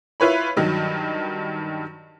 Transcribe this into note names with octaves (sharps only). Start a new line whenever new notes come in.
E4 F4 B4 C#5 B5
G2 D#3 F#3